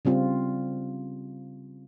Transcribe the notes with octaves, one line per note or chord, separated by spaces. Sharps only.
C#3 G3 C4 F4